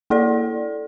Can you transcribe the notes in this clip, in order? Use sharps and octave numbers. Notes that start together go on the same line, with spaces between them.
A#3 E4 A4 D5